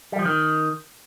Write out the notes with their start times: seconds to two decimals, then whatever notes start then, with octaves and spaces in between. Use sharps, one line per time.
0.12 G3
0.19 F3
0.25 D#3